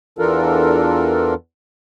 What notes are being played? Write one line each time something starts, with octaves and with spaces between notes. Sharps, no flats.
E2 E3 D4 F4 A4 A#4